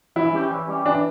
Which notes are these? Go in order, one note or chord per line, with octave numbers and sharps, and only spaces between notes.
E3 E4
G3 C#4 G4
E3
G3 C#4 G4
E3 D4